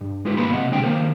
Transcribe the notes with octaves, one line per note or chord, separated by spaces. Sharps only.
G2
G#3 D#4 F4 G4 B4
G#2 A#3 B3 B5 C6
C2 C3 D#5 F#5
B1 D3 G#3 C4 G5
D#3 E3 A#3 A#4 C5